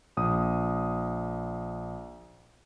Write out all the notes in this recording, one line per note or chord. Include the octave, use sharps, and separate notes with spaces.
A#1 D#6